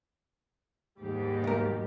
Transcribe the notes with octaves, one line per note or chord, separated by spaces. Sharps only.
D#2 G#2 G3 G4
B1 A#4